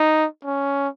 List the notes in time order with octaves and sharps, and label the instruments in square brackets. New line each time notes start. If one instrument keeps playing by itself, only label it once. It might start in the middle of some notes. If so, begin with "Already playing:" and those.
Already playing: [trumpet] D#4
C#4